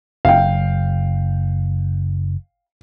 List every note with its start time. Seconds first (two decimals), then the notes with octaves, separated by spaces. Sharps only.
0.25 F#1 F5 G5